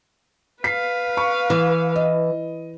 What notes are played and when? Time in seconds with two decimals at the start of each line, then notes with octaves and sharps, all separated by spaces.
0.64 B4 F5 B6 C7
1.17 C#6
1.50 E3
1.96 D#5